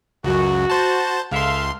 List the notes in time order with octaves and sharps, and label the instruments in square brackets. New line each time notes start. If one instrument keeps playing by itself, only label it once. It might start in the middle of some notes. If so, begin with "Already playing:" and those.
[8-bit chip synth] C#2 F#2 [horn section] F#4
[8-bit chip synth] C5 A5
[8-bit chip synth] C#2 C6 [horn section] A4 E5 F5